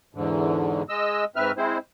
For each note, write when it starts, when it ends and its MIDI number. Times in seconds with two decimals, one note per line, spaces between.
0.15 0.82 40
0.15 0.82 44
0.15 0.82 50
0.89 1.24 56
0.89 1.24 75
0.89 1.24 88
1.36 1.52 44
1.36 1.52 60
1.36 1.52 71
1.36 1.52 76
1.36 1.52 89
1.57 1.78 56
1.57 1.78 60
1.57 1.78 64
1.57 1.78 72